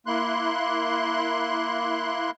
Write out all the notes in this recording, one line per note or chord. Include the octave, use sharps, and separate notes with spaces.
A#3 E4 C6 F#6